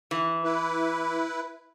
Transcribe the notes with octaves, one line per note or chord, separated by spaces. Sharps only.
E3
E4 B4